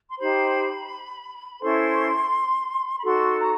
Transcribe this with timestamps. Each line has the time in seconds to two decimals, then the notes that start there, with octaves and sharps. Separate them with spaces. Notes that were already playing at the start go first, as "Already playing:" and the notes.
0.11 C6
0.18 D#4 G4 C5 B5
1.61 C#4 E4 A4 C5 C6
2.98 B5
3.04 D#4 F#4 A4 C6
3.39 A#5